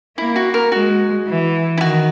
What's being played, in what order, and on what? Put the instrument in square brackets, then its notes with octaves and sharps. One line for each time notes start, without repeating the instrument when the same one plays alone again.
[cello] A#3 [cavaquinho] E4
[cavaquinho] F#4
A#4
[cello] G#3 [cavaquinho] F#4
[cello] E3
[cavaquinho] E4
[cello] D#3 [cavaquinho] F#4